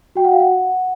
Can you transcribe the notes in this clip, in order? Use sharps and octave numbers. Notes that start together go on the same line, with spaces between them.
F#4 G5
F#5
F5
F#5